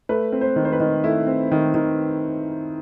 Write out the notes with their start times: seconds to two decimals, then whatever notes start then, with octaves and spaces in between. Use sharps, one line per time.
0.09 A3 B4
0.32 C4
0.41 C5
0.56 D#3
0.65 C5
0.73 B4
0.80 D#3
1.04 A3 E4
1.27 C4
1.52 D#3
1.74 D#3